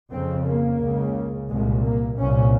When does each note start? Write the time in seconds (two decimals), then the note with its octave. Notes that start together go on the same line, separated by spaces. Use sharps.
0.11 F2 C#3 C4
0.46 A#3
0.81 C#2 C#3
1.49 C2 A#2 G#3
1.84 A#3
2.18 C2 A#2 C#4